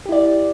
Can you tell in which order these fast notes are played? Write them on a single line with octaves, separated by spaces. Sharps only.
G4 E4 D5